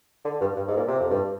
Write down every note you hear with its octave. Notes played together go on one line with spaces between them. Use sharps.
D3
G2
G2
G#2
A#2
C3
F2
G2